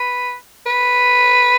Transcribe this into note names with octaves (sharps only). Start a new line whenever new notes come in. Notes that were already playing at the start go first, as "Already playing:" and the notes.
Already playing: B4
B4